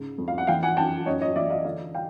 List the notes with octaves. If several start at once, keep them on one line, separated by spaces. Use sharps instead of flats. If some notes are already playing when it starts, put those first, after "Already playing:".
Already playing: G#2 C#3
F2
F5
F#5
E3 F5 G5
F#5 G#5
F#2 G5 A5
F#2 C#5 D#5
C#5 D#5
E3 D5 E5
D#5 F5
D3 D#5 F5
F5 G5